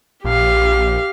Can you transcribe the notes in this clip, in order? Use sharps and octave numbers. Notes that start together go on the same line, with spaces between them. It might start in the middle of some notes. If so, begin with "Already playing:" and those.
A#1 G4 F5